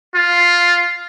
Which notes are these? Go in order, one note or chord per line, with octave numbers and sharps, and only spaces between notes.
F4